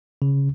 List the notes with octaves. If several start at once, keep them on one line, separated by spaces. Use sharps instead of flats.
C#3